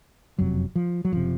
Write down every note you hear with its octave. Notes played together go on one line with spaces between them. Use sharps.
F#1 F2 C3 F#3
F3
F#3
F#1 C3 F3